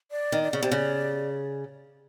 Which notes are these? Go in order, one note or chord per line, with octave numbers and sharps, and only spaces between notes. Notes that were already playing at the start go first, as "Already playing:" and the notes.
D5
D#3
D5
C#3
C3
C#3